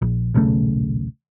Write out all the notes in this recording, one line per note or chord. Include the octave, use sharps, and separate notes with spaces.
A#1
D#1 B1 C#3 A3